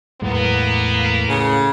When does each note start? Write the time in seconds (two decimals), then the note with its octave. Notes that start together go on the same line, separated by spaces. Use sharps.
0.22 E2 A2 F#3 G#3 A#3 B3
1.29 C#3